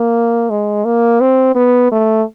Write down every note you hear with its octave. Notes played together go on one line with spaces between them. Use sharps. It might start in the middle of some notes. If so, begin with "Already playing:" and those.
Already playing: A#3
G#3
A#3
C4
B3
A3